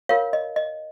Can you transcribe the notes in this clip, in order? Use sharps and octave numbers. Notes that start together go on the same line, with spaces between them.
F4 A#4 C#5 F5
D#5
D#5